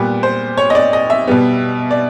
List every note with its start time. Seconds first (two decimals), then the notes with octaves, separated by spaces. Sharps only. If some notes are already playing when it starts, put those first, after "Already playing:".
Already playing: A#2 G3 B3 B4
0.23 C5
0.57 C#5
0.70 D#5
0.75 D5
0.93 D#5
1.10 E5
1.27 B2 G3 B3
1.91 D5